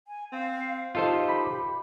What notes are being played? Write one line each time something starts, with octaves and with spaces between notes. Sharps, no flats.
G#5
C4 F5
D#4 F4 G4 A4 C5
B5